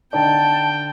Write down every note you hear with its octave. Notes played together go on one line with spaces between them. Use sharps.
D3 D#4 D5 G5 A5